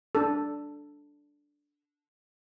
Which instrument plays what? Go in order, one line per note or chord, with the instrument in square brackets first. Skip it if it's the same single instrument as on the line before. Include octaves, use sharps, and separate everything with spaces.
[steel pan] D4 A4